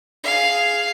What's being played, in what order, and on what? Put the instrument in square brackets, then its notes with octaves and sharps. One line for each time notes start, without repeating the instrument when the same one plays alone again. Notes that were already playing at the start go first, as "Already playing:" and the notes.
[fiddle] G#4 F5